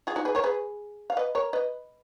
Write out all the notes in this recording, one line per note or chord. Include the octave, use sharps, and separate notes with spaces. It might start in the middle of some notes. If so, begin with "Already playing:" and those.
F4 G#4
D#4 F#4
G#4 B4
A#4 C#5
G#4 B4
F5
B4 D#5
A#4 C#5
B4 D#5